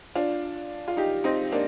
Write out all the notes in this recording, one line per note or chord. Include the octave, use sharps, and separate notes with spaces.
D4 F4
F4
D#4 G4
C4 D#4
A#3 D4